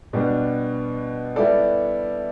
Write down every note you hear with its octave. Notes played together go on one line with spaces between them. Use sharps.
B2 G3 B3 D4
G3 B3 E4 A4 D5